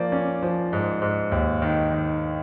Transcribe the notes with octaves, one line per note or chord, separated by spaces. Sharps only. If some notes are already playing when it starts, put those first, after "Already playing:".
Already playing: F3 A#3 D5
C#4
F3
G#2
G#2
D#2
D#3
D#3